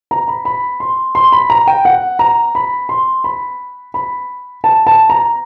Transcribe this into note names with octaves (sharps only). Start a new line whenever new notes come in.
A#5
B5
B5
C6
C6
B5
A#5
G5
F#5
A#5
B5
C6
B5
B5
A5
A5
A#5